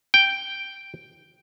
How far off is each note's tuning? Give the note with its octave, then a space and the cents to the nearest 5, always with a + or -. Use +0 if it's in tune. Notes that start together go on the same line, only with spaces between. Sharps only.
G5 +0